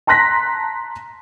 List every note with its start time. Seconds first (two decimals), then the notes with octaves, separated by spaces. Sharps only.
0.07 A5 A#5 C6 F#6 A#6 B6